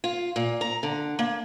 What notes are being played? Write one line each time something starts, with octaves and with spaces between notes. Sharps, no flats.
F4
A#2
A#5
D3
A#3